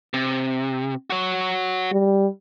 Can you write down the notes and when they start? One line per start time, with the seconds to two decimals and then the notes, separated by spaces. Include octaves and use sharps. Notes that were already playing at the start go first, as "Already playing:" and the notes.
0.14 C3
1.10 F#4 C#5
1.92 G3